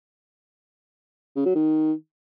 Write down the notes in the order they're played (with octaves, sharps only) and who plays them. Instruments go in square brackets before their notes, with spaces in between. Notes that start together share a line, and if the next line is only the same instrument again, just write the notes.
[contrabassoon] C#3
F#3
D#3